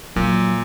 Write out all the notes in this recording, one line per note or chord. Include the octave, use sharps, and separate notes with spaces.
A#2 F#3